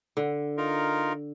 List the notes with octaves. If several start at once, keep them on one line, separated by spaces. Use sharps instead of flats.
D3
D#4 F4 A#4